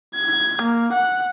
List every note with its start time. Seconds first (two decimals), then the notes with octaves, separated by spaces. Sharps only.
0.16 G#6
0.62 A#3
0.93 F#5